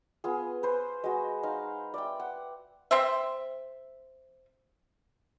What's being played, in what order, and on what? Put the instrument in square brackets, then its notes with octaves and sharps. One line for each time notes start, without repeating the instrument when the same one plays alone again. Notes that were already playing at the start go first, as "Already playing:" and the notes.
[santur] B3 F4 G#4
B4 C5
G#3 F#4
D#4 F5
D5 E5 G5
F#5
[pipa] C4 C5 E5